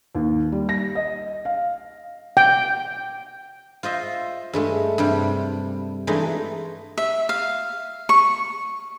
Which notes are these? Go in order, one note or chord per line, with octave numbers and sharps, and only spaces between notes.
D#2
G3
A#6
D#5
F5
G5
F4 C5 D#5 E5
G2 G#3 A3
G2 C3 G3
E3 G#3 A3 D4 D#4
E5
F5
C#6